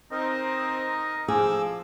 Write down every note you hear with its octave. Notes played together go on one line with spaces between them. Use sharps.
C4 D#4 A#4 D#5
F3 G#4 D6 E6